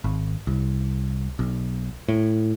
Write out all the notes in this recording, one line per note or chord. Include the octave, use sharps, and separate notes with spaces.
G#1
C2
B1
A2